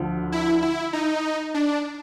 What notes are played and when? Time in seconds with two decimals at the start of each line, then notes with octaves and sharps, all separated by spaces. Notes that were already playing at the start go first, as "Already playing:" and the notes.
Already playing: D2 D3 F3
0.32 E4
0.63 E4
0.93 D#4
1.54 D4